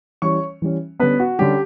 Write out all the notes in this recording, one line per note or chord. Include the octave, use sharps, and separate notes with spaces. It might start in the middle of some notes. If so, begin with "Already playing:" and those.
E3 G3 C#4 C#5 C#6
E3 G3 C#4
D3 G3 B3 C#4 B4
F#4
D3 G3 C#4 G4